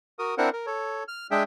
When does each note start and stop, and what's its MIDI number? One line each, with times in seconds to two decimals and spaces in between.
0.19 0.35 66
0.19 0.35 70
0.19 0.35 87
0.38 0.50 60
0.38 0.50 62
0.38 0.50 64
0.38 0.50 70
0.38 0.50 72
0.38 0.50 78
0.53 0.66 70
0.66 1.04 69
0.66 1.04 73
1.08 1.27 89
1.31 1.43 56
1.31 1.43 62
1.31 1.43 68
1.31 1.43 76
1.31 1.43 79